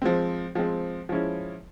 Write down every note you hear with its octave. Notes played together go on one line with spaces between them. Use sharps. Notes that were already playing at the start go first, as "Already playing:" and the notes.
F3 G#3 C4
F3 G#3 C4
F3 G#3 C#4 E4